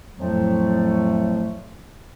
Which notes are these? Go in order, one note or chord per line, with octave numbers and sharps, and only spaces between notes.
F2 A2 F3 F#3 A3